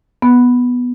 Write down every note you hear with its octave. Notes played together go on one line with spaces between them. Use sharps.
B3